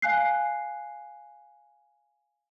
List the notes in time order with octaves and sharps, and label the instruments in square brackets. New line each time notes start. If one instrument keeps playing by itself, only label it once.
[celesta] F5 G#5 F#6 C7